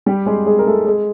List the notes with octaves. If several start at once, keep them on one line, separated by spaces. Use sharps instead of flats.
G3 G4
G#3 G#4
G#3 G#4
A#4
A3 A4
G#3 G#4